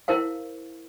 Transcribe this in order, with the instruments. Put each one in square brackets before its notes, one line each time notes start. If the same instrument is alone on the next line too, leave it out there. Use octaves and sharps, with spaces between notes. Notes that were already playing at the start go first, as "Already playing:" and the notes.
[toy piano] E4 A#4 C5 F5